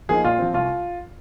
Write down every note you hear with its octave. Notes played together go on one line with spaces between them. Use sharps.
F3 A#3 D#4 G#4
A#2 F4
F3 C4
C2 F4